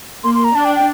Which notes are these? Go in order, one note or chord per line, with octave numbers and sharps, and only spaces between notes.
A#3 C6
C6
A#5
D4 A5
G5
G5